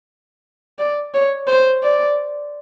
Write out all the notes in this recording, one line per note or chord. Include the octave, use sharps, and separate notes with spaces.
D5
C#5
C5
D5